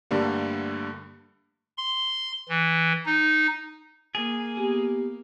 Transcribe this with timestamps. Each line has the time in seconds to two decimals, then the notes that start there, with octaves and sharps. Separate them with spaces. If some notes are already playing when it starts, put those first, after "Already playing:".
0.11 G2 D3 G3 A3 A#3
1.78 C6
2.49 E3
3.06 D#4
4.15 A#3 G#4
4.57 B3 G4